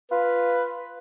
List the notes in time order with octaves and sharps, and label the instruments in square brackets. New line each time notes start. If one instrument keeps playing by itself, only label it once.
[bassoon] F4 [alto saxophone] B4